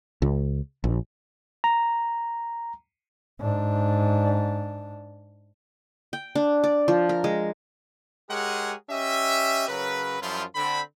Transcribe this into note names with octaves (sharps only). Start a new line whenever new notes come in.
C#2
A#1
A#5
G#2 D4
G5
D4
D5
F3
A#4
G#3
G#3 G4 G#4 A#4 C#5 F#5
C#4 G4 D#5 E5
C#3 F#3 A#4 B4
F#2 F3 G3 E4 F4
D3 C4 B5